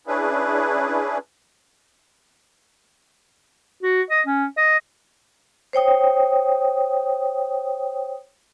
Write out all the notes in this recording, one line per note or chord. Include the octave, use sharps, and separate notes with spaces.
C#4 D4 E4 G#4 B4
F#4
D#5
C#4
D#5
C5 C#5 G5 D#6